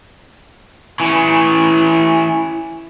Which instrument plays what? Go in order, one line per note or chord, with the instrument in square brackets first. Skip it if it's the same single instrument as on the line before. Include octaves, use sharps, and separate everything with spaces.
[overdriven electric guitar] E3 C#4